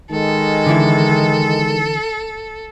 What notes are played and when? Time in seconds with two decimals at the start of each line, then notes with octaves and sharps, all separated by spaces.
0.12 D#3 G#3 A4
0.66 D3 E3 E4